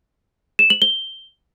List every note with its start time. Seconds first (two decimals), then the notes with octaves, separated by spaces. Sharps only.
0.59 E7
0.70 F#7
0.82 G7